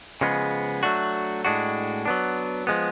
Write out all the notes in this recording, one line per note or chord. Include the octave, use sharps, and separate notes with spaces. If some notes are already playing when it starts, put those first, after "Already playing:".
C#3 F3 G#3 B3
F#3 A3 D4 F#4
A2 G#3 D4 F#4
F#3 B3 D4
F3 G#3 B3